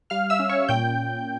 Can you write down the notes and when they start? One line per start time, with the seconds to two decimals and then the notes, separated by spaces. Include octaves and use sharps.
0.10 G3 F5 F6
0.30 E5 E6
0.39 C#4
0.49 C#5 C#6
0.68 A#2 G5 G6